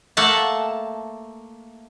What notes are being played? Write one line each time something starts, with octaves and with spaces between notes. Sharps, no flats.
A3 A#3 A4 F#5 A5